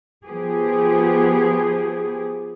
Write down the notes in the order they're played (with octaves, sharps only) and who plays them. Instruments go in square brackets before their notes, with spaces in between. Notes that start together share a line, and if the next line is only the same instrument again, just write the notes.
[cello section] F3 B3 G4 G#4